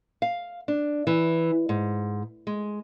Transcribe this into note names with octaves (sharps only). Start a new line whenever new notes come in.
F5
D4
E3
G#2
G#3